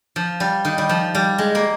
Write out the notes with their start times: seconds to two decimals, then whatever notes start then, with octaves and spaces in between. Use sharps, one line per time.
0.16 F3
0.40 G3
0.65 D#3
0.78 G3
0.89 F3
1.15 G3
1.38 G#3
1.55 A#3